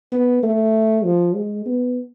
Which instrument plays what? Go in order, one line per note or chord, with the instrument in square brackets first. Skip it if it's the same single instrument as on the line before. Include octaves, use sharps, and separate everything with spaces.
[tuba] B3
A3
F3
G#3
B3